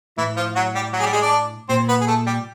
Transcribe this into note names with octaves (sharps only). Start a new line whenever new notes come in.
A2 E3 E4
F3 F4
F#3 F#4
G3 G4
F#3 F#4
G#4
G3 G4
G#3 G#4
D4 D5
A#2 C4 C5
B3 B4
G#4
A3 A4
G3 G4